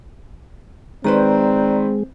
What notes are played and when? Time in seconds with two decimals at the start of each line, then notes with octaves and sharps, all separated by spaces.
1.04 D#3 G#3 C4 B4 C5 D5 A#5